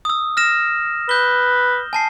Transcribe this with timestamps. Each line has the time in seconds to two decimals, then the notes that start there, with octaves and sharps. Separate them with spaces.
0.05 D#6 E6
0.37 F6 A#6 E7
1.09 B4 G6 G7
1.93 G#5 A5 C7